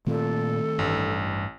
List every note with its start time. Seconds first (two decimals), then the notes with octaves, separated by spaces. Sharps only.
0.07 A#2 D#3 A3 C4 A4
0.79 A1 G2